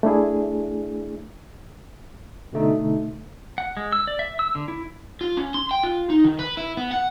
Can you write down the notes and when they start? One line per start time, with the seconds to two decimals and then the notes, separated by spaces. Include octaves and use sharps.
0.03 A3 D4 E4 G#4
2.53 B2 D3 A3 D#4
3.58 F#5
3.77 G#3
3.92 E6
4.07 D5
4.19 E5
4.39 E6
4.55 D3
4.68 E4
5.21 F4
5.37 C#4
5.54 C6
5.71 G5
5.83 F4
6.10 D#4
6.24 D#3
6.39 B4
6.57 E4
6.77 B3
6.91 F#5